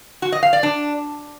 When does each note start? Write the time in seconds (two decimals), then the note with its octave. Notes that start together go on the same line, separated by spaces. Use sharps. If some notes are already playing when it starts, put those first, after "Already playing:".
0.22 F#4
0.32 D#5
0.43 F5
0.53 D5
0.63 D4